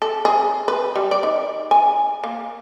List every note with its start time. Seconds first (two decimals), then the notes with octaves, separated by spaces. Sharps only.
0.02 A4
0.25 G#4
0.68 B4
0.96 G3
1.11 D5
1.23 D#3
1.71 G#5
2.24 A#3